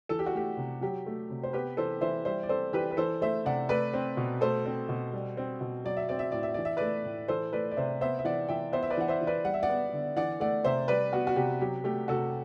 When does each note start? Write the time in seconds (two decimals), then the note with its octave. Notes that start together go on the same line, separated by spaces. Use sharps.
0.09 E3 A4
0.19 G4
0.26 F#4
0.33 A3 G4
0.57 C3
0.81 F#3 G4
1.06 A3
1.30 C3
1.43 C5
1.53 B3 G4 B4
1.77 E3 A4 C5
2.01 E3 C5 E5
2.25 G3 C5 E5
2.43 D5
2.49 C4 A4 C5
2.73 E3 G4 B4
2.91 B4
2.97 E3 A4 C5
3.21 A3 C5 E5
3.45 C3 D5 F#5
3.69 A3 B4 D5
3.94 C4
4.17 B2
4.41 A3 A4 C5
4.66 C4
4.89 B2
5.13 G3
5.37 C4
5.61 B2
5.85 F#3 D5
5.97 E5
6.09 C4 D5
6.19 E5
6.32 A2 D5
6.43 E5
6.54 E3 D5
6.65 E5
6.77 A3 B4 D5
7.05 A2
7.28 E3 A4 C5
7.52 A3 B4 D5
7.71 D5
7.77 C3 C5 E5
8.01 B3 C5 E5
8.19 E5
8.24 E3 D5 F#5
8.49 E3 E5 G5
8.72 B3 C5 E5
8.83 E5
8.90 B4 D5
8.97 E3 F#5
9.08 C5 E5
9.21 E3
9.27 B4 D5
9.44 G3 F#5
9.54 E5
9.63 D5 F#5
9.69 B3
9.93 D3
10.17 E3 D5 F#5
10.40 A3 D5 F#5
10.64 C3 C5 E5
10.88 G3 B4 D5
11.12 B3 F#4
11.27 F#4
11.36 C3 G4
11.61 F#3 G4
11.84 A3 G4
12.08 C3 F#4 A4